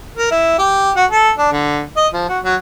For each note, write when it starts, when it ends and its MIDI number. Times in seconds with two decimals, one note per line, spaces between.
0.17 0.31 70
0.31 0.58 64
0.58 0.91 67
0.96 1.05 66
1.11 1.31 69
1.38 1.48 62
1.52 1.83 50
1.96 2.07 75
2.13 2.26 53
2.29 2.39 66
2.44 2.55 54